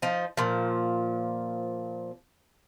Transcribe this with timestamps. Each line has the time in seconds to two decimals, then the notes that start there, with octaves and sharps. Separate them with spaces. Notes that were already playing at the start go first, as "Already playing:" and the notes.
0.02 F3 D#4
0.37 A#2 F3